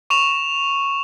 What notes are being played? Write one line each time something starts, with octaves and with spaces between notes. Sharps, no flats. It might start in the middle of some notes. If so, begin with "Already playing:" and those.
C#6 E7 F7